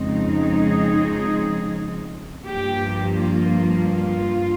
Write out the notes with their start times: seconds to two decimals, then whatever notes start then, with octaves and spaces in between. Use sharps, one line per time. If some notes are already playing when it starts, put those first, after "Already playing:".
Already playing: F2 C#3 G#3 C4 D#4
0.30 G#4
2.45 G2 F3 A#3 G4
3.17 F4
3.88 F4